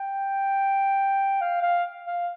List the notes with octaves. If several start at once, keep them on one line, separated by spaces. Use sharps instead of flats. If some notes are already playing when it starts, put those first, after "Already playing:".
Already playing: G5
F5
F5
F5